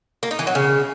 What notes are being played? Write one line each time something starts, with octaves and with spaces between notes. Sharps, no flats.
A#3
D#4
E3
F#3
C#3